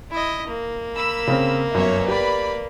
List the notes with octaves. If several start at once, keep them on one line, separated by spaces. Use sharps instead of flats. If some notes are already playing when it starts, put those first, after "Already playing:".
E4 D#5
A#3
B5 E6
C#3 C4
G1 F#2 C#5 E5
G4 B4 D5 B5